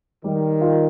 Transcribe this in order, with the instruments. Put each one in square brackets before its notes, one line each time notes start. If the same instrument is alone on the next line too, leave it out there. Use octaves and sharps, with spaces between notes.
[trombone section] D#3 [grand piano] G3
[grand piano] F4